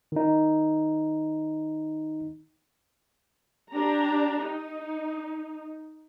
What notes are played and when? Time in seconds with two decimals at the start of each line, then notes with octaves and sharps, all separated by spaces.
0.12 D#3 D#4
3.72 D4 G4 A#5
4.43 D#4